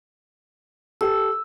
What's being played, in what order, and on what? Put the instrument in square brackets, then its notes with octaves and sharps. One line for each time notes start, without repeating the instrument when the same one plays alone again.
[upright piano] G4 A4 [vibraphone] E6